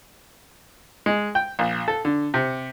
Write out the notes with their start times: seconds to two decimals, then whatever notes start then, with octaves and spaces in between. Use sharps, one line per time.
1.06 G#3
1.35 G5
1.59 A#1
1.88 A4
2.05 D3
2.34 C3